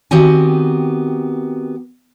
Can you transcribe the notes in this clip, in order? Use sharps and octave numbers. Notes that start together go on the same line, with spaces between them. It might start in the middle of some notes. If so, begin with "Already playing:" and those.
D#3 B3 C4 F#4 G4 G#5